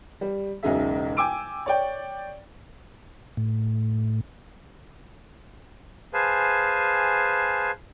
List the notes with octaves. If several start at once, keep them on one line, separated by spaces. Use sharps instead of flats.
G3
E1 B1 C#3 D#4 G#4 E5
G5 G#5 D6 E6 D7
C#5 D5 G5
A2
G#4 B4 C5 F5 G#5 A5